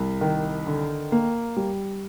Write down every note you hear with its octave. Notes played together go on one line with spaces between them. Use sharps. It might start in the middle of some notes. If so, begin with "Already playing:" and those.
Already playing: C2
D#3
D3
A#3
G3